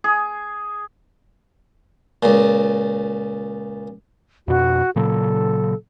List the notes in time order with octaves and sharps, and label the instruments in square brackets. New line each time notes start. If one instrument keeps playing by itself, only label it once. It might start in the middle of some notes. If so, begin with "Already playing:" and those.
[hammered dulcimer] G#4
[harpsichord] C#2 A#2
[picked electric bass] F2 B2 [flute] F#4
[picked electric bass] A#2 C#3 F#3 [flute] A4